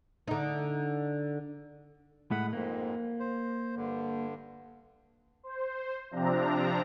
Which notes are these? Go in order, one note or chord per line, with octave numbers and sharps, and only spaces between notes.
D3 D#4
A2 G#3 A3 F#5 B5
F2 G#2 A#3
C5
G2 D3
C5
C3 F3 C4 D4 A#5